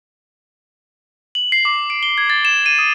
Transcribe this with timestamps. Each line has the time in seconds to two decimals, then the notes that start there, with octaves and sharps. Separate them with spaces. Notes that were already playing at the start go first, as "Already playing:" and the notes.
1.35 F#7
1.52 C7
1.65 D6
1.90 D7
2.03 G7
2.18 G#6
2.30 A6
2.45 E7
2.66 D#7
2.79 D#6